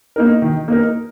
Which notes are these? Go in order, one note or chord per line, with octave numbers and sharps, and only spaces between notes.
A#3 D#4 A#4
D#3
A#3 D#4 A#4